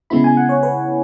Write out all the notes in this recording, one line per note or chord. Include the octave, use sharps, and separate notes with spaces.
C#3 G#3 B3 E4 B5
G#5
F#5
C#5
B4